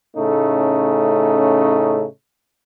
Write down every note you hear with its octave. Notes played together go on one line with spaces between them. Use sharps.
A2 C#3 A3 C#4 D#4